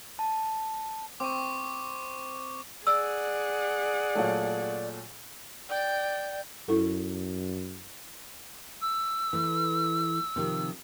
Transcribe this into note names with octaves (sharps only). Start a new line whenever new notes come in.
A5
C4 C#6 D6
G#4 D5 F#5 E6
A#2 F#3 A3
D5 G5
F#2 E4 A4
E6
E3 A3
C3 D#3 F3